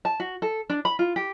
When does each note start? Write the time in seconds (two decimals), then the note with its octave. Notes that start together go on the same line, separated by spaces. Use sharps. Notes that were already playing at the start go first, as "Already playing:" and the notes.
0.05 A5
0.20 F#4
0.42 A4
0.70 D4
0.85 B5
0.99 F4
1.16 G4